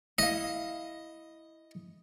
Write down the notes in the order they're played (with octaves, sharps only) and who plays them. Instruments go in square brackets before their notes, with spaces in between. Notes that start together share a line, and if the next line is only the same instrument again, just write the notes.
[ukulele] E4 F5 [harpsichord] D#5